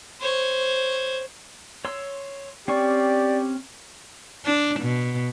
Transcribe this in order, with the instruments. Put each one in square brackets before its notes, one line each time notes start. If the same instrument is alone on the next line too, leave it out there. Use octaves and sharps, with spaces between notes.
[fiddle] C5 C#5
[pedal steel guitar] C#5 C6 E6
[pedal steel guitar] C4 C#4 C#6 [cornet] G4 [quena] D5
[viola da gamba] D4
B2